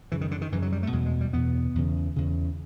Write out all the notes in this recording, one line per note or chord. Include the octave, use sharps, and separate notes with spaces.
F#2 C#3 E3
D#3
D3
D#3
F#2 C#3 E3
F#3
G3
A3
E2 B2 G#3
G#3
G3
E2 B2 B3
E2 C#3
E2 C#3